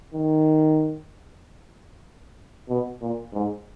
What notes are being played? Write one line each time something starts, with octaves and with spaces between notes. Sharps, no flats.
D#3
B2
A#2
G#2